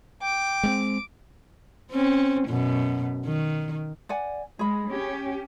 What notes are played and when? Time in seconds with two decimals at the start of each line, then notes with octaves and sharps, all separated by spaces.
0.22 G5 D6
0.63 G#3 B3 C4
1.92 C4 C#4
2.48 F#2 B2
3.26 D#3
4.09 D5 F#5 G#5
4.59 G#3 G#4 B5
4.90 C#4 G4